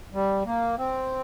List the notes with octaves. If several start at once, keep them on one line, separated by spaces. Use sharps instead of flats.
G3
A#3
C4